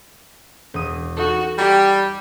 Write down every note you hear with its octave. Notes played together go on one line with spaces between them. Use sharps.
E1 D#6
D#4 F#4 A4
G3 G4 A#5